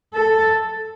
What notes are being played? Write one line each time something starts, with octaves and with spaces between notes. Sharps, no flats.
A4